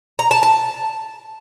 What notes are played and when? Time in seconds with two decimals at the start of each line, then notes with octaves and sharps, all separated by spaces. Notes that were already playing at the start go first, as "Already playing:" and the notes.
0.19 A#5
0.31 A5
0.43 A5